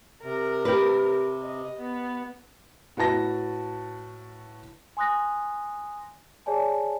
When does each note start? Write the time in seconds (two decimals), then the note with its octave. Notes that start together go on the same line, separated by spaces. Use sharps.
0.24 C3 A#4
0.65 G4 B4
1.43 D#5
1.81 B3
2.97 A2 F#4 B4 A5 A#6
4.97 G#5 C6 D#6 F#6 A#6
6.46 G#4 C#5 D5 G#5 A5